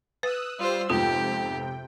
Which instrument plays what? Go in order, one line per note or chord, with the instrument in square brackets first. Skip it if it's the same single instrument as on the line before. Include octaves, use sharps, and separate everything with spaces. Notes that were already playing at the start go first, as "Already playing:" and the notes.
[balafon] B4 [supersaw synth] D#6 E6 F#6
[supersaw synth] G3 E6 [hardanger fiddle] F4 C5
[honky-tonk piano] F2 G#2 B3 [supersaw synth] C3 G5 [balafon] F4 [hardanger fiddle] G4